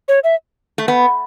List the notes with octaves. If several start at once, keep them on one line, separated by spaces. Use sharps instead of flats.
C#5
E5
A3
B3